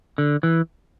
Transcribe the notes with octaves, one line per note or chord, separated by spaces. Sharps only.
D3
E3